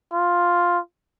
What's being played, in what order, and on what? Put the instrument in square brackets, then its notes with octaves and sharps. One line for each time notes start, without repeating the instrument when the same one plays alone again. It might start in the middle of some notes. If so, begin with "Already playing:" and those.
[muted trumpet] F4